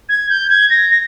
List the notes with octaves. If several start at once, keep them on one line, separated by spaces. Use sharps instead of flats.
G#6
G6
G#6
A#6
A#6